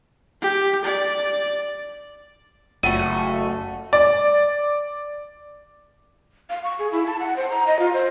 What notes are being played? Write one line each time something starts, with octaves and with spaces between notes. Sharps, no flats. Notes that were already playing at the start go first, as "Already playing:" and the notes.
G4
D5
F#1 A3 F4 F#4 F#5 G5 D#7
D5
F5
C#6
G#4
E4
A5
F#5
C5
A#5
D#5
F4
C5